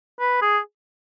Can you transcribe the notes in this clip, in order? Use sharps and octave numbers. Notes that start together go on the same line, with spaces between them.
B4
G#4